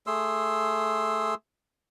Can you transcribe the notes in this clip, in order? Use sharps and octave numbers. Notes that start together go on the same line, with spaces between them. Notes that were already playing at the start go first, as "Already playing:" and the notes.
A3 G#4 C6 E6